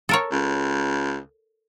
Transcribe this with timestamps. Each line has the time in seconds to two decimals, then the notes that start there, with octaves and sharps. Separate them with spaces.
0.09 A4 A#4 C#5
0.31 C#2